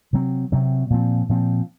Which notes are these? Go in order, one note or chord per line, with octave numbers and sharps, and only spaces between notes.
C3 F#3 C4
C3 F#3 C4
A#2 F3 C4
A#2 F3 C4